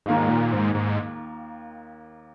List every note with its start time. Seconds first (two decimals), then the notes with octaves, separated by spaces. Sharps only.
0.06 D#2 G#2 D#3 A#3 F4
0.29 A#2
0.52 G#2
0.75 G#2